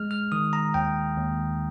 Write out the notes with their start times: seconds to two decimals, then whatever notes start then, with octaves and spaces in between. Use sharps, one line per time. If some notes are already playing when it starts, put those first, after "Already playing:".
Already playing: G#3 F6
0.11 F6
0.32 D#3 D#6
0.53 A#5
0.74 D#2 G5
1.17 D#2